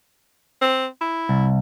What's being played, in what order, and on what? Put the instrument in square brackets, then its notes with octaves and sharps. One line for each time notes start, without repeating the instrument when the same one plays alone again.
[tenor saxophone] C4
E4
[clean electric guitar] C2